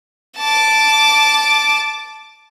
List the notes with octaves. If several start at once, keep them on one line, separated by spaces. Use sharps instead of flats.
A5 D6